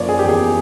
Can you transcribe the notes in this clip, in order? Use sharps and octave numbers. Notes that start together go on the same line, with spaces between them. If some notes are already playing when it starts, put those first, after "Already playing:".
Already playing: F#1 F3 C#5 D5
G#4
G4
E2 G#4